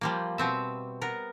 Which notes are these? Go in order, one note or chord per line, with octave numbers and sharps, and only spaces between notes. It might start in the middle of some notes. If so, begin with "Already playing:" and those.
F3 G3 A#3
B2 C4 E5
B3 A#4